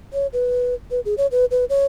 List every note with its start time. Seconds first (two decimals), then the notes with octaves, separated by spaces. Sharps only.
0.13 C#5
0.33 B4
0.91 B4
1.05 G#4
1.18 C#5
1.32 B4
1.51 B4
1.70 C#5